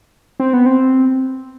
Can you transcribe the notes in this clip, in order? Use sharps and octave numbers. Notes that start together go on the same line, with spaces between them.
C4
B3
C4